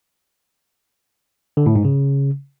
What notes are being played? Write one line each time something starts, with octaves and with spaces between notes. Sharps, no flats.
D3
A2
G#2
C#3